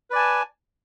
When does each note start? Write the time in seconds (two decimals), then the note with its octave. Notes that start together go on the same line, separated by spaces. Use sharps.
0.10 B4
0.13 D5
0.16 G#5
0.18 A5